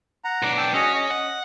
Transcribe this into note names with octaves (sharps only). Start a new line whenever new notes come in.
F#5 A#5
B1 D4
G5 A5 E6
C#4 F#4 G#4 D#5
D#5
F#5